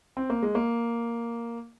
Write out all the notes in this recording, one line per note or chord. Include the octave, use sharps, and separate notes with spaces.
C4
A#3
G#3
A#3